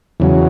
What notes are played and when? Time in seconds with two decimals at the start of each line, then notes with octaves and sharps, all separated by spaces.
0.20 E2 C#3 F#3